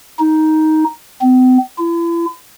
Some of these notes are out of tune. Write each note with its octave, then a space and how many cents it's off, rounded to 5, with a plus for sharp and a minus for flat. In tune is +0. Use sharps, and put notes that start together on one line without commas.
D#4 +10
C4 -45
E4 +40